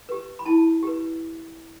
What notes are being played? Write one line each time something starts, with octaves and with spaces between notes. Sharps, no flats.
G4 B4
B5
E4 A5
G4 B4